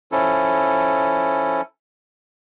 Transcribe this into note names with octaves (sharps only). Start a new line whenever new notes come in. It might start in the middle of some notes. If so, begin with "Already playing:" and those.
F3 C#4 E4 A4